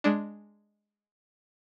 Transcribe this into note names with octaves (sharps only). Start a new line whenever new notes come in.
G#3 D4